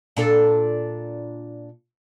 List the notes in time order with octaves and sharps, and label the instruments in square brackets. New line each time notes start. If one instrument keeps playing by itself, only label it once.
[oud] A#2 D4 A4